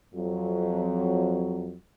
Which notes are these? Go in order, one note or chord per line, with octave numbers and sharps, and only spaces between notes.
F2 F#3